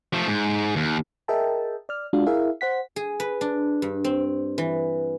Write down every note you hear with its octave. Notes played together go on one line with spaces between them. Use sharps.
F3 A3
G#2
D#2
G#4 A#4 D#5 E5 G5 A5
D5 F6
G#3 D4 F4 F#4 F5
E4 G#4 A#4 E5 F5
C5 F#5 B6
G#4
B4
D4
G2
C4
E3